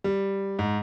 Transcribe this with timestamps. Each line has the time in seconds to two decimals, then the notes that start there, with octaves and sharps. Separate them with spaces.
0.04 G3
0.59 G#2